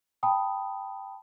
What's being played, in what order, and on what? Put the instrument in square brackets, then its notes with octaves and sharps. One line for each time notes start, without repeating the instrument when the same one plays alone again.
[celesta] G5 A5 B5 D#6